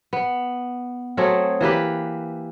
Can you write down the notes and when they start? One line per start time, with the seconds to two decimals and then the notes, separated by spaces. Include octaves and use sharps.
0.13 B3
1.17 F#3 A3 C4 G#4
1.61 E3 A#3 G4 B4